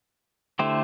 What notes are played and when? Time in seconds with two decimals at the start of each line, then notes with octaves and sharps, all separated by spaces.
0.59 D3 A3 E4 G4 C5